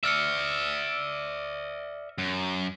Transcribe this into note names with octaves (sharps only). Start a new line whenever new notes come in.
D5 E5 E6 F6 C#7
F#2